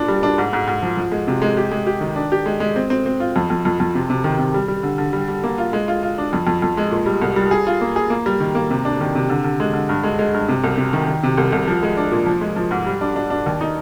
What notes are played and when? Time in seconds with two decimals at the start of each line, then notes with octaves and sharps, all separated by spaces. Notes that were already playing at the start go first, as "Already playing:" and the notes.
Already playing: A#2 D4
0.08 G3
0.23 D4
0.38 G#2
0.53 G#2
0.68 G#2
0.82 F3
0.97 F3
1.12 G#3
1.27 C3
1.42 G#3
1.57 G4
1.72 G#3
1.87 G4
2.01 D#3
2.16 D4
2.32 G4
2.46 G#3
2.60 G#3
2.76 C4
2.90 C4
3.06 C4
3.20 F4
3.36 F2
3.50 F2
3.65 F2
3.80 F2
3.95 C3
4.10 C3
4.24 D#3
4.39 C3
4.54 G3
4.68 G3
4.83 D3
4.98 D3
5.13 G3
5.28 G3
5.43 A#3
5.58 F4
5.73 G#3
5.88 F4
6.03 F4
6.18 D4
6.33 F2
6.47 F2
6.62 F2
6.77 G#3
6.91 A#2
7.06 G3
7.22 C2
7.36 G3
7.51 G#4
7.67 F4
7.81 A#3
7.96 G#4
8.10 A#3
8.26 G3
8.40 D#3
8.55 A#3
8.71 C3
8.85 D4
9.00 D#3
9.15 C3
9.29 D3
9.44 D3
9.60 G#3
9.74 D3
9.89 G2
10.03 G#3
10.19 G#3
10.34 G2
10.49 C3
10.64 C2
10.78 C3
10.93 D#3
11.08 D#3
11.23 C3
11.38 C2
11.52 C2
11.67 F3
11.83 G#3
11.97 D4
12.11 A#2
12.26 F3
12.41 G#3
12.56 F3
12.71 G#2
12.87 G3
13.01 D4
13.16 D4
13.30 D4
13.46 D#2
13.61 D#4